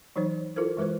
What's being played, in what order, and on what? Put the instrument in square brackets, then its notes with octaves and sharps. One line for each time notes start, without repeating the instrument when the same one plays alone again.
[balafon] E3 F#3 D#4 C5 C#5
E4 F4 A4 A#4 C5
E3 G#3 F4 B4 C5